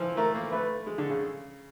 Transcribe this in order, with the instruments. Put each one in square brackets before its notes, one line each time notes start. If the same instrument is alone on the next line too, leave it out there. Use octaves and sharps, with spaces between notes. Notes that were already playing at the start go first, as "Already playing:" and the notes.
Already playing: [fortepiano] E3 F3
[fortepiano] A3 [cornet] A#4
[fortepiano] A#3
[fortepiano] A3 [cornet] B4
[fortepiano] G#3
D3
C#3